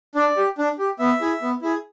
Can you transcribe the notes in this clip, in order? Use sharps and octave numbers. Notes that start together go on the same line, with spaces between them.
D4 D5
G4
D4
G4
B3 E5
E4 G#4
B3
E4 G#4